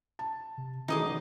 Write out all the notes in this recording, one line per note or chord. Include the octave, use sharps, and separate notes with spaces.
A5
C3
D#3 E3 A3 D#4 G#4 D#5 D6
G#1